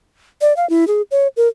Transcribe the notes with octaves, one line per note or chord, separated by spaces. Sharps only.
D5
F5
E4
G#4
C#5
A#4